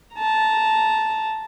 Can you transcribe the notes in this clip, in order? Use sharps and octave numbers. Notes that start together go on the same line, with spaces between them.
A5 A#5